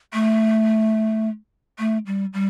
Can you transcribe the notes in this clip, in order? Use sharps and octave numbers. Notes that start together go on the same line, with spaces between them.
A3
A3
G3
G3